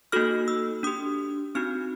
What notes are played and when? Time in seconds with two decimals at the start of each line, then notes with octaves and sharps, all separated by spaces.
0.12 A#3 D#4 F#4 A4 F6
0.48 E6
0.83 D4 G4 D#6
1.55 C4 D#4 F#4 F6